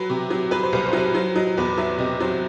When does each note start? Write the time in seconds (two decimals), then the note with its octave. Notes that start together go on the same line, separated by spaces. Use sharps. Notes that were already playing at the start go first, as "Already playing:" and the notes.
Already playing: F#3 B4
0.10 C3
0.31 F#3
0.51 F#3 B4
0.63 C5
0.73 C2 B4
0.87 C5
0.93 F#3 B4
1.15 F#3 C5
1.36 F#3 D#5
1.58 E2 B4
1.78 F#3 E5
1.99 C3 D#5
2.20 F#3 C5